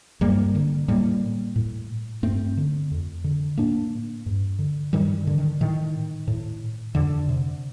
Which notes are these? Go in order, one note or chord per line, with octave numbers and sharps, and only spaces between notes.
G2 G3 A#3
D3
A2 G3 A#3
A2
G2 A3 C4
D3
F2
D3
A2 A#3 D4
G2
D3
G2 D#3 G3
D3
D#3
A2 D#3
A2
F2 D3
C3